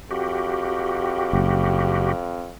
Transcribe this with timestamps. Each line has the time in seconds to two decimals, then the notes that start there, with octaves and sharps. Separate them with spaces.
0.11 F2 F#4 G4
1.33 F#1